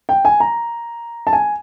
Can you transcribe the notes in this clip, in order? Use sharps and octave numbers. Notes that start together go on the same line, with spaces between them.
G5
G#5
A#5
A5
G#5